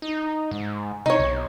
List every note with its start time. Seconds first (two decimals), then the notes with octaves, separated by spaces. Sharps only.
0.02 D#4
0.51 G#2
1.06 C3 D#4 C#5
1.20 B1